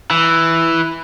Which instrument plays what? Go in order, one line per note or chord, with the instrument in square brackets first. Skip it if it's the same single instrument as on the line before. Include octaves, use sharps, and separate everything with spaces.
[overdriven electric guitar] E3